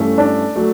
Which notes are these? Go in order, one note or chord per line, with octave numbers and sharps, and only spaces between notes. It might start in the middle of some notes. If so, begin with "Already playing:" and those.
Already playing: G2 E3 A3 C#4
D4
F#3 A3